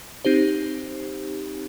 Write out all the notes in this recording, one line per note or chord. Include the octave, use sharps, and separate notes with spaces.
C4 D#4 G4 C5